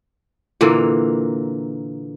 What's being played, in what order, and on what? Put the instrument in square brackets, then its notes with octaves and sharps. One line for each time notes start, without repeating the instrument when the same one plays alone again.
[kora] A#2 D3 E3 A#3